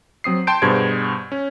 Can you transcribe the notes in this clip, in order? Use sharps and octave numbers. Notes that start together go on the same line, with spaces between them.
F#3 C4 D#6 C7
G5 A5 C6 G6 D7
G2 B2 F#4 G#4 C5 G#6
C#4